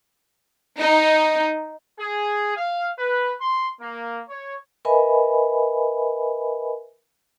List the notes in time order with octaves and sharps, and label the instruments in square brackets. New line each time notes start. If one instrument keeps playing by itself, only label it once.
[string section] D#4
[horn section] G#4
F5
B4
C6
A#3
C#5
[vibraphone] A#4 B4 D#5 E5 G#5 B5